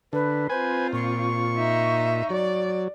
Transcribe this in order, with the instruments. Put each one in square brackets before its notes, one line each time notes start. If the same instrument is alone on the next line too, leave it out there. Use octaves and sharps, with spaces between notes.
[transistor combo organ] D3 [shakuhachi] B4
[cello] C4 F4 [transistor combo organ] B4 G#5 [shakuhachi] C5
[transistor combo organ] A#2 [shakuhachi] C#6
[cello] D#4 E5
[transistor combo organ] F#3 [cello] D5